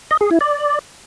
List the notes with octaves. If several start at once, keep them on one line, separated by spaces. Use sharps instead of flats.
D#5
G#4
E4
D5